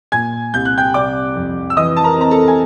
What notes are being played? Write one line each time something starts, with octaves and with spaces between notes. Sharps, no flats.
A#2 G#5 G#6
C2 G6
F#6
G5 G6
C3 D5 D6
F2
E6
E3 D#5 D#6
A5
A#4 A#5
C4 A#5
A4 A5
G#5